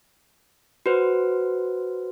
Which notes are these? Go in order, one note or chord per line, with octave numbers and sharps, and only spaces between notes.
F#4 B4 C5